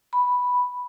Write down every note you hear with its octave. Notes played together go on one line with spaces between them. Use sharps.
B5